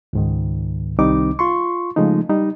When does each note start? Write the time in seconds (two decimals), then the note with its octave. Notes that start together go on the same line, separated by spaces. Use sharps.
0.13 C#2 G#2 D#3
0.99 C2 D#3 G3 C4 D#4 D6
1.39 F4 C6 C#6
1.96 C#3 F3 G#3 A3 D#4
2.29 G3 D#4